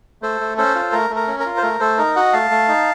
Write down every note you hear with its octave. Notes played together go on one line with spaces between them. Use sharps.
A3 A4 C5
A3
C#4 A4 C5
F4
A3 A#4
A3
A#4
C#4
A#4
F4
C5
A3 A#4
A3 A4 C5
D#4 A#4
F#4 D#5 F#5
A3 F5 A5
A3
D#4